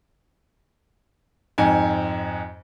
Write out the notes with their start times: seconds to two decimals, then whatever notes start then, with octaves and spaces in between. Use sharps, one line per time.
1.58 F2 G#2 G#5